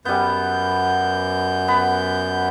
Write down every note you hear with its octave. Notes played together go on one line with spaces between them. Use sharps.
F#2 G3 B3 G6
B3 B5